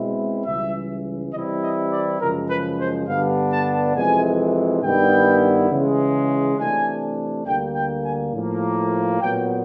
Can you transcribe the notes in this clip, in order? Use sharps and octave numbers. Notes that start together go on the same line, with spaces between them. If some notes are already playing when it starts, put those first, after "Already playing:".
Already playing: B2 G#3 C4 E4
C#2 C#3 E3 G3 E5
C3 E3 G3 C4 E4 D#5
D#5
D5
F#2 C#3 F3 G#3 A#4
B4
C5
G2 D3 G3 B3 D4 F5
A5
F2 C3 E3 G#3 G#5
G2 D#3 G3 B3 E4 G5
C#3 E3 G#3
C3 E3 A3 D4 G#5
D2 D3 G3 A#3 G5
G5
G#5
A2 F3 A#3
A#2 F#3 B3 G5